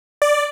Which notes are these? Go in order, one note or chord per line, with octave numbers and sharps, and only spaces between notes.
D5